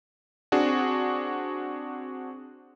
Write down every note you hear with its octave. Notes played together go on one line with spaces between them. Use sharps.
C4 D4 F#4 G#4